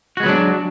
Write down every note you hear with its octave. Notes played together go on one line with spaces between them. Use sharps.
F#3 G#3 B3 D4 F#4